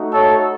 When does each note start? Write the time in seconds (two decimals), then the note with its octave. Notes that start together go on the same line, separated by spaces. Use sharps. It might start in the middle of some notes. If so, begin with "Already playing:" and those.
Already playing: A3 D#4 F#4
0.13 A4 C#5